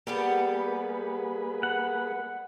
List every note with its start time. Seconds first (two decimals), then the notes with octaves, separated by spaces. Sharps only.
0.07 G3 A#3 B3 G4 G#4 B4
1.63 F#5